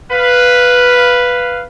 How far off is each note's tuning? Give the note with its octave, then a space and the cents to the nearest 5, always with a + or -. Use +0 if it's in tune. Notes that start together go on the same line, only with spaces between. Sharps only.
B4 +0 F5 -5